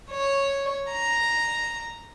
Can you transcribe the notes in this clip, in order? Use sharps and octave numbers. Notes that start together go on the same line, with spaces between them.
C#5
A#5